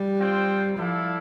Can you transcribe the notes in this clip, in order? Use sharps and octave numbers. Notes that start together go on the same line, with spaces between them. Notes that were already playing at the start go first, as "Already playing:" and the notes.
Already playing: G3
C4 F4 C5 G5
F3 E4 A4 D5 F5